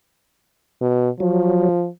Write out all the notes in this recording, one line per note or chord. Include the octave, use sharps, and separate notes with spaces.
B2
F3 F#3